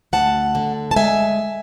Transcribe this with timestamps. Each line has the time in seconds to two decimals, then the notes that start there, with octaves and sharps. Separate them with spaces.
0.13 D2 F#5 A5
0.55 D3
0.91 A5
0.96 G#3 E5 G#5